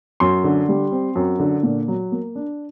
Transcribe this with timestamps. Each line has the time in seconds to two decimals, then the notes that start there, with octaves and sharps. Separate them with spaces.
0.20 F#2 C6
0.44 D3
0.69 G3
0.92 C4
1.15 F#2
1.39 D3
1.63 A#2
1.88 F#3
2.12 A#3
2.36 D4